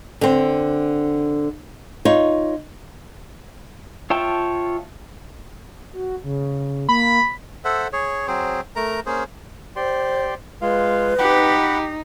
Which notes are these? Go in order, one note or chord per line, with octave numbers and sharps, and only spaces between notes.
D3 C4
D#4 F4 C#5
F4 C#5 E5 G5 A5
F#4
C#3
A#3 B5
A4 C5 E5 F#5
G#4 C#5
F#3 C4 G#4 C5
A3 A#4 A#5
A#3 C#4 G#4 C5
G4 C5 D5 C6
G#3 F4 B4 F5
D#4 G4 F#5 B5